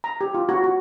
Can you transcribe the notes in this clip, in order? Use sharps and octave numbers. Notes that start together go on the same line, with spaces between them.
A#5
G4
F4
F#4
F#4